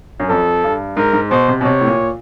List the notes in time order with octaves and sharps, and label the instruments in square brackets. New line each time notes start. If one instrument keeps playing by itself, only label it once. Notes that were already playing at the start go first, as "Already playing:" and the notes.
[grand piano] F#2
[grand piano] F2 [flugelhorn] A4
[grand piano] G2
[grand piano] G#2 [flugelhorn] A#4
[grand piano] G#2
[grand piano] B2 [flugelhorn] C5
[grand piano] C3
B2
[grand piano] C3 [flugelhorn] C#5
[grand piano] A2
A#2